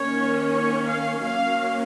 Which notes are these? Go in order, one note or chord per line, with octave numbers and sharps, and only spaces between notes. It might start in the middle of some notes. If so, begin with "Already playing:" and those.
Already playing: D#3 A#3 C#4 C#5
C#5
F5
F#3 A#3 C#4 F5